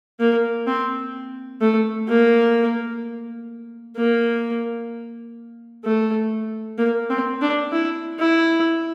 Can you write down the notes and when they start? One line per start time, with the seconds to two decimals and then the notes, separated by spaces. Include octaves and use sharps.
0.20 A#3
0.67 C4
1.61 A3
2.09 A#3
3.97 A#3
5.84 A3
6.78 A#3
7.10 C4
7.42 D4
7.72 E4
8.20 E4